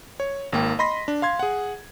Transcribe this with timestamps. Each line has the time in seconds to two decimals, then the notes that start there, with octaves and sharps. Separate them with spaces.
0.20 C#5
0.53 G#1 A#3 G5
0.79 D#5 B5 C6 A#6 B6
1.08 D4
1.22 F5 C6 G#6
1.39 G#4 F#5